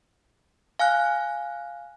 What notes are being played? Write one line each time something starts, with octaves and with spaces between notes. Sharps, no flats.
F5 G#5 F6 F#6